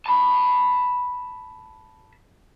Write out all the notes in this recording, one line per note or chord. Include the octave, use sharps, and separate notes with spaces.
A5 B5